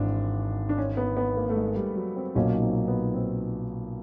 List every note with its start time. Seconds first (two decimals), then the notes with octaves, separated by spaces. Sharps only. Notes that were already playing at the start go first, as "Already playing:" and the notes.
Already playing: G#1 G#2 E3 D4
0.69 D4
0.78 C#4
0.97 B3
1.17 B3
1.37 A#3
1.49 A3
1.56 G#3
1.76 G3
1.96 F#3
2.16 C4
2.35 B1 A#2 F#3 A#3 C#4 D#4
2.62 C4
2.88 B3
3.14 C4